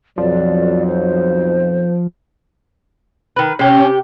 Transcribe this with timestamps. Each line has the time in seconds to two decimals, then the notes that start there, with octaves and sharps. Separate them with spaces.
0.18 B1 F2 F3 F#3 D5
0.87 C5
3.36 D#3 B4
3.59 C3 C#4 G4